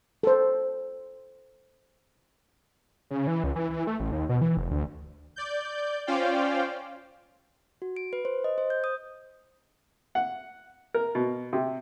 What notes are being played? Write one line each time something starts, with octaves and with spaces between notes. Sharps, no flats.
A4 C5
C#3
E3
C#2
E3
E3
A3
A1
D#2
B2
E3
F1
D2
D5 G6
C#4 F4 C5 D5 F5 G5
F#4
D7
B4
C5
D#5
C5
G6
D#6
F#5
A#4
B2
C3